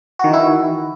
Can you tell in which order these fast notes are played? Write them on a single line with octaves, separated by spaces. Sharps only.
F#4 D#3 E3 E4